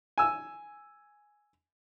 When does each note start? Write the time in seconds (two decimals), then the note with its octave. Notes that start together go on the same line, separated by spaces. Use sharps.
0.18 G#5 E6